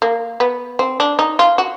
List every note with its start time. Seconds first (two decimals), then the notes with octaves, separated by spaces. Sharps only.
0.02 A#3
0.40 B3
0.79 C4
1.00 D4
1.19 D#4
1.39 F4
1.58 F#4